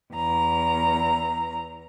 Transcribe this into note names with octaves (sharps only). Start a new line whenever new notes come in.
E2 A#5